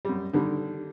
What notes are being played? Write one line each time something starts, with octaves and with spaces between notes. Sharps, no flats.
F#2 G3
D3 D#3 G3